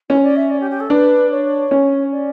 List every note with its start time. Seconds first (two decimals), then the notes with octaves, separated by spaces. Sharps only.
0.09 C#4 E4
0.16 C#5
0.23 D5
0.36 E5
0.49 D5
0.60 G4
0.70 G4
0.80 A4
0.90 D4 B4
1.31 C#5
1.71 C#4
2.11 D5